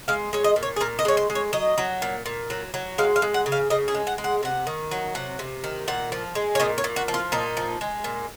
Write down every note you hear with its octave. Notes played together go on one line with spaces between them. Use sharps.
G#3 F5
G#3 C#5
D#5
A#2
C#5
G#4
A#2 A#4
D#5
G#3 C#5
C5
G#3
C#5
F#3 D#5
F#3
A#2
A#2
F#3
F#3
G#3 F5
F5
G#3
F#5
C#3
F5
C#3 D#5
G#4
G#3
F#5
G#3
F#5
C3 F#5
D#3
F#3
C3 F#5
C3
D#3
A#2 F#5
F3
G#3
C#5
A#2 D#5
C#5
A#2
F#4
F3
F4
A#2 D#4
F3
G#3
A#2